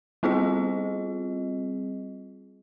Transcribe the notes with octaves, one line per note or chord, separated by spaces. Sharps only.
G3 C4 F4 G#4 D#5